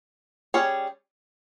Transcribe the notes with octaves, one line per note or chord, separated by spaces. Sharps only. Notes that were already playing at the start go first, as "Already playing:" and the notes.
G3 C#4 G#4 C#5